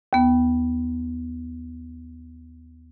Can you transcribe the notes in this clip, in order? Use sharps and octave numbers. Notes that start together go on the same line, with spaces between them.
D#2 B3